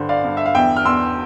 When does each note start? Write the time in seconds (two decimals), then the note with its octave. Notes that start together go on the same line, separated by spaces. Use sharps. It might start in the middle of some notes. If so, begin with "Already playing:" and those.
Already playing: G2 D3 C5
0.09 D5 F5
0.24 G2
0.37 E5
0.46 F5
0.55 E2 E5 G5
0.76 F6
0.85 E2 C6 E6